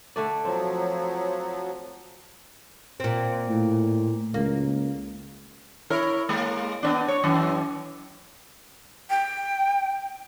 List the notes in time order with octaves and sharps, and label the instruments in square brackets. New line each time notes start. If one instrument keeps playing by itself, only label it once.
[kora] D3 A3 D5
[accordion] F3 F#3 [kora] C4
[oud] A#2 C4
[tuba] A2
[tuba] C#2 [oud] A#3
[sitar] E4 A#4 C#5
G#3 A#3
B3 C4 D4
C#5
F#2 E3
[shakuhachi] G5